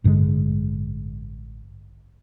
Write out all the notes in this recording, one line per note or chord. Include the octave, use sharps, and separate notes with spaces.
A1 G2 D3 G#3